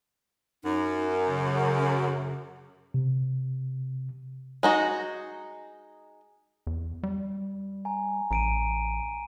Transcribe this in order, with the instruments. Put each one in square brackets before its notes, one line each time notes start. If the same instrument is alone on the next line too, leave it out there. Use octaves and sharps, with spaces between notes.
[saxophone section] F#2 [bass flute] D#4
[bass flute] C#3
[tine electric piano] C3
[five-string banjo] G#3 D#4 F#4
[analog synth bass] E2
G3
[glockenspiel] G#5 A#5
[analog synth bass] A1 [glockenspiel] A#5 D7 D#7